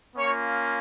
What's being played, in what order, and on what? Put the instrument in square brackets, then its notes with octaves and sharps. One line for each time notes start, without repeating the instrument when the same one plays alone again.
[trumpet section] A#3 C#4 F4 C#5